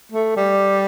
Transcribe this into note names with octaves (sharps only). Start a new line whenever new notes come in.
A3
G3